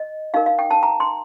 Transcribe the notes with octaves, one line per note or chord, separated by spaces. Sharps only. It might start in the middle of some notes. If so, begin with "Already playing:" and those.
Already playing: D#5
D#4 A#4 F5
F5
G5
A5
A#5
C6